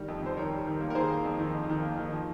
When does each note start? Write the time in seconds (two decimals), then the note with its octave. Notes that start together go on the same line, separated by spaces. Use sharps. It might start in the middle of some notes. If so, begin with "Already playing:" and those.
Already playing: D#3 G3
0.08 F2
0.22 F2 C5
0.37 D#3 A#4 C#5
0.52 G3
0.66 D#3
0.80 A#3
0.90 A#4
0.95 D#3 G#4 C5
1.10 A#3
1.24 F2
1.39 D#3
1.54 F2
1.69 D#3
1.83 A#3
1.97 D#3
2.13 F3